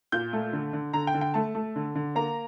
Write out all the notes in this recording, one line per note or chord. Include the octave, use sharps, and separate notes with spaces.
A#2 G6
A3
D3
D3
D3 A#5
G5
D3
G5
A3 A5
A3
D3
D3
A#3 A#5